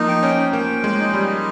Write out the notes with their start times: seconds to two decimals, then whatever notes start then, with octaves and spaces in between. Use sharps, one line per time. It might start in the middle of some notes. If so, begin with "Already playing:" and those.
Already playing: F3 A#3 D#4
0.08 G5
0.23 C#4
0.53 A#3 G5
0.84 G#3
0.99 D#4
1.14 G3